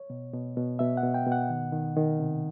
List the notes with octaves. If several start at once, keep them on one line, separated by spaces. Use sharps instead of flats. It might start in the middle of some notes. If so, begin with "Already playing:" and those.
Already playing: C#5
B2
B2
B2
B2 E5
F#5
B2
G5
B2 F#5
D#3
D#3
D#3
C3